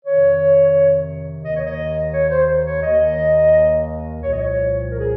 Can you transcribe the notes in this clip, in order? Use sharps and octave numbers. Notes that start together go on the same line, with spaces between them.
F2 C3 D#3 C#5
D#2 D#3 D#5
C#5
D#5
C#5
C5
C#5
D#2 D#3 D#5
C2 A#2 F3 C#5
D#5
C#5
A#4
G#4